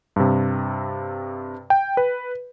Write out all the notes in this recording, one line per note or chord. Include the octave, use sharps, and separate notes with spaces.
G2 C3
G5
B4